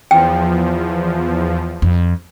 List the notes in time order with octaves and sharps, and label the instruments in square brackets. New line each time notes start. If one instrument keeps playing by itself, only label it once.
[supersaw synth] E2 F3 [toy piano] G5
[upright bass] F2